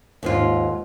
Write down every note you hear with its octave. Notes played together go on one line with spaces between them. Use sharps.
D#2 G#2 F4